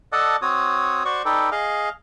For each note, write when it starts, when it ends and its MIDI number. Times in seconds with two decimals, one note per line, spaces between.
0.12 0.36 69
0.12 0.36 74
0.12 0.36 75
0.12 0.36 78
0.12 0.36 81
0.42 1.03 60
0.42 1.03 66
0.42 1.03 73
0.42 1.03 87
1.05 1.22 66
1.05 1.22 72
1.05 1.22 74
1.05 1.22 85
1.25 1.50 63
1.25 1.50 69
1.25 1.50 71
1.25 1.50 74
1.25 1.50 79
1.52 1.89 68
1.52 1.89 75
1.52 1.89 77